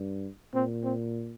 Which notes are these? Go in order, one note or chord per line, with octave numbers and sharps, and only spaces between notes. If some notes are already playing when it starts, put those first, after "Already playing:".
Already playing: G2
A#2 C4
C4